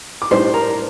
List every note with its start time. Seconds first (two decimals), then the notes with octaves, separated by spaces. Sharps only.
0.22 D6
0.31 A2 G3 D4 C5 C6
0.54 A#4 A#5